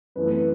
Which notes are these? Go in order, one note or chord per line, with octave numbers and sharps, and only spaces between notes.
F#2 E3 A3 B3 C4 B4
B4